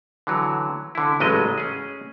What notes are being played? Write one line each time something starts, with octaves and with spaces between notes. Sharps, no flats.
D3 E3 F#3
D3 E4
A1 C#3 F#3 G#3 A3 D#5
C#4 G#4